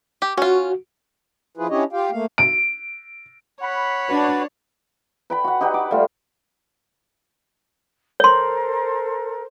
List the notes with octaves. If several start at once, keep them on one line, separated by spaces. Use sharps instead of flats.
G4
C#4 F4 F#4
F3 E4 F4 G#4 B4
C#4 D4 E4 G4 C#5 D#5
F4 G4 F5 G5
A3 A#3 F5
D7
C#5 F#5 B5
D4 F#4 B4
B4 G5 B5
F#4 F#5
D#4 G4 B4 F#5
D6
G3 A3 F4
A4 A#4 C5 C#5 C6